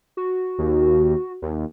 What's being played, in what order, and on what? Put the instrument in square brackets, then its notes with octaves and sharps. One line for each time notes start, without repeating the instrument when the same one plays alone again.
[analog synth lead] F#4
[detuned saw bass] D#2
D#2